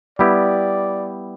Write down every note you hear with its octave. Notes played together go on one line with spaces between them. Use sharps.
G3 B3 E4 G4 D5